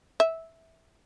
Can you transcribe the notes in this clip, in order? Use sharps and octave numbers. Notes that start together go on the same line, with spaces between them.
E5